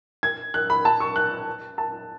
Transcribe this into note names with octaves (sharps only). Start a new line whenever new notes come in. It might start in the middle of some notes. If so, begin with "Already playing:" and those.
G#6
F#6
B5
A5
C#6
F#6
A5